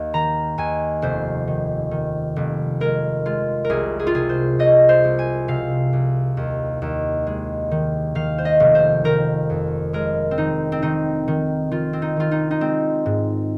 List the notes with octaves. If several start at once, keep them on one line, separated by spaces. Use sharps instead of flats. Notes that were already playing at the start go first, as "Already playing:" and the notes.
Already playing: D#2 F5
D#3 A#5
D#2 G#5
F1 C5
D#3
D#3
F1
G#3 A#4
G#3 F4
A#4
C2 G#4
G#4
F4
C3 G#4
C5
C2 D#5
C5
C2
G#5
C3 F5
C2
D#2
D#2
G#3
D#3
D#3 F5
C5
D#5
F1
C5
D#3 A#4
F2
G#3 A#4
C4
D#3 D#4
C4
D#3 D#4
D#3
D#3 F4
C4
D#4
D#3 F4
D#4
D#4
G#3 C4
G#2